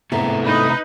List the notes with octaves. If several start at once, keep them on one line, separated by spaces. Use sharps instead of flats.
G#2 C3 A3 B3 E4 A4 A#5
D#4 B4 B5